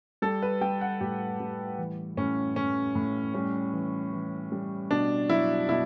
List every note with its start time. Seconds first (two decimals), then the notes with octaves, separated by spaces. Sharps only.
0.22 G3 A4
0.42 B4
0.61 G3 G5
0.81 F#5
1.01 A2 G4
1.40 G3
1.78 E3
2.17 A2 C#4
2.56 A2 C#4
2.95 A2
3.34 G3 C#4
3.73 E3
4.13 E3
4.52 G3
4.91 B2 D4
5.29 F#3 E4
5.69 B2 E4